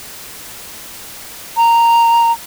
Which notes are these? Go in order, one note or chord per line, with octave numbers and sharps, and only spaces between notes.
A#5